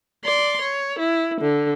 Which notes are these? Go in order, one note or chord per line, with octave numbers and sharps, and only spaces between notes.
D5 C6
C#5
E4
D3